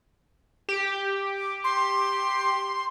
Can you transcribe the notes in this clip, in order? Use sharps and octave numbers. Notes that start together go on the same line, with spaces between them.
G4
C6